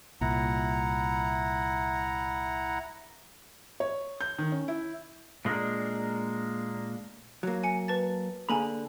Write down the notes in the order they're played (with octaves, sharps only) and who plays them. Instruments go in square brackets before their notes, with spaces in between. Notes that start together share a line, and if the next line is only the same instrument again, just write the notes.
[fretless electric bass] C2 A#2 [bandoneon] E4 F#5 A#5
[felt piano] C#5
G6
D#3
C#4
E4
[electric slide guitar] A#2 G#3 A#3 D4
[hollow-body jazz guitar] F#3 A#3
[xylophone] G#5 C#7
B4 A5 A6
[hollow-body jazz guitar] D3 A#3 B5 [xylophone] G#4 A4 G#5